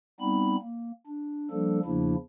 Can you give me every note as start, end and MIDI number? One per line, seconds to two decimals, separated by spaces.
0.20 0.56 55
0.20 0.56 59
0.20 0.56 60
0.20 0.56 63
0.20 0.56 83
0.61 0.92 58
1.07 1.50 62
1.51 1.80 53
1.51 1.80 55
1.51 1.80 58
1.51 1.80 62
1.51 1.80 69
1.85 2.15 40
1.85 2.15 49
1.85 2.15 53
1.85 2.15 58
1.85 2.15 62
1.85 2.15 64